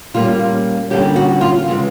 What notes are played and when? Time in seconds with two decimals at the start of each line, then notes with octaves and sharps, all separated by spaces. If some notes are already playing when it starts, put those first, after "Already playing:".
0.14 A#2 G3 A#3 C#4 F4
0.90 D3 G3 A#3 C#4 G4
1.16 F#4
1.41 F4
1.68 C#3 E3 G#3